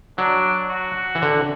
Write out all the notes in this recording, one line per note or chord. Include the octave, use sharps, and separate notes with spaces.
F#3 D4
F#4
E3
D3